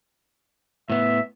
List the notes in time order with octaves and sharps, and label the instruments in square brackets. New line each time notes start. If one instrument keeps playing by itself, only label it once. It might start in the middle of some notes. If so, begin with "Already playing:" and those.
[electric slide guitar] A2 B3 [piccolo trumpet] E5